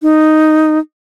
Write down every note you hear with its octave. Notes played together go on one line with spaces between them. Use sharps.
D#4